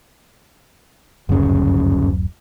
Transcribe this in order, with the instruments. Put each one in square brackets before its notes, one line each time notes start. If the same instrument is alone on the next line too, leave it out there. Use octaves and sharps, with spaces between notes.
[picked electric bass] D1 F#2 [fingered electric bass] G1 C#3